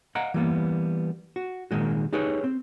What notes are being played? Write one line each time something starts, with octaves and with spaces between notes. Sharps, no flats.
D#5 F5 F#5 A#5
E3 G3 A#3 B3
F#4
A#2 D#3 G#3 F#4
D#4 G4 G#4 B4 C#5
C4